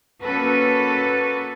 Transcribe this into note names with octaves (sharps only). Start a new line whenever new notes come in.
A#3 C#4 F#4 A4 B4